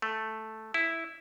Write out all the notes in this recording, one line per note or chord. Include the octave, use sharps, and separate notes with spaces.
A3
E4